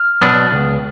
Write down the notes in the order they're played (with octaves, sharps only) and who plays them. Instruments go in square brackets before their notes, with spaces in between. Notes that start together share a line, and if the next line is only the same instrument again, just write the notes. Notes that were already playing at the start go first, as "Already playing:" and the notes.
Already playing: [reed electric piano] F6
[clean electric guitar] B2 F#3 B3 D4
C#2